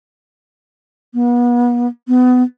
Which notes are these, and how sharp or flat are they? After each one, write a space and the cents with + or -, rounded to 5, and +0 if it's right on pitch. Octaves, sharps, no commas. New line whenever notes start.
B3 -35
B3 +25